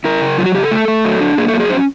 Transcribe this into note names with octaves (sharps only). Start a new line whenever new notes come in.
E4 A#4
C#3
F#3 F4
F#4
C#3 G4
A4
A3
A3
F#3
D4
A#3 G#4
A4
F#3
G#4
C#4 C5